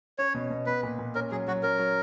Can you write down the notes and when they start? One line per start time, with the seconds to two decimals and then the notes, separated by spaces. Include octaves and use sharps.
0.19 C#4 C#5
0.34 B2
0.50 B2
0.66 B3 B4
0.83 A#2
0.99 A#2
1.15 C#4 A#4
1.31 F#3 G#4
1.48 F#3 F#4
1.63 C#4 A#4
1.79 F#3